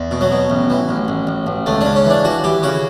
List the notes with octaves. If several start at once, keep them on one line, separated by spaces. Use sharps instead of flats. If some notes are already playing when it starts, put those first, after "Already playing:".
Already playing: E2
B2
F#3
B2
A1
E3
A1
A1
A1
A1
C#2 A3
C#3 D4
C#4
E3
D4
E3 F#4
E3 G4
C#3 F#4